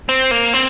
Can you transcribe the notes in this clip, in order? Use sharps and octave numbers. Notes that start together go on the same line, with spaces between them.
C4
A#3
C4